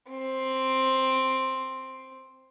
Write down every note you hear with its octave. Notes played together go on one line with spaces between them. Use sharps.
C4